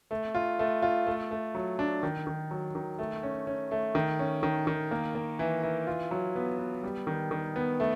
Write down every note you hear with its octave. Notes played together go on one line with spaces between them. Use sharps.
A3
F4
A3
F4
A3
A3
F#3
D4
D#3
D#3
F#3
D#3
A3
C#4
C#4
A3
D#3
C#4
D#3
D#3
A#3
A#3
E3
E3
F4
F#3
B3
B3
G3
D#3
D#3
B3
A3